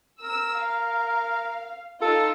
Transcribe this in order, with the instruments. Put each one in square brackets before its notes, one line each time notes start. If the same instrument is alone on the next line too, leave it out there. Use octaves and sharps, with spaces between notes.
[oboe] A#4 [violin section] E6
[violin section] F5
[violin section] D#4 F4 [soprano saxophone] A4 [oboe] E6